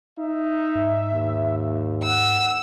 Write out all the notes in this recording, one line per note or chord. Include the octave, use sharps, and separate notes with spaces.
D#4 E5
G#2
D#2
F#5 E6